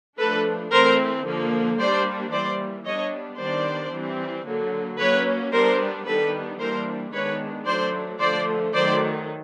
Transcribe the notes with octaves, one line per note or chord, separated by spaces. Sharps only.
F3 A3 D4 A4 B4
E3 A3 C4 A#4 C5
D3 F3 A#3
G3 A#3 D4 C5 D5
E3 G3 A#3 C5 D5
G3 B3 D4 C#5 D#5
D#3 G3 B3 D4 C5 D5
E3 G3 C4
D3 F#3 A#3
F#3 A#3 C#4 B4 C#5
G3 B3 D4 A#4 C5
D#3 G3 B3 D4 A4 B4
E3 G3 A#3 D4 A#4 C5
D#3 G#3 B3 D4 B4 C#5
F#3 A3 D4 C5 D5
D3 F3 A3 C5 D5
D#3 F#3 A3 C5 D5